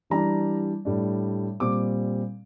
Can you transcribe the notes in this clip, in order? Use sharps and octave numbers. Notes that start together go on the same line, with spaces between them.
E3 G3 D4 A#5
A2 G3 D4
A#2 G3 C4 D6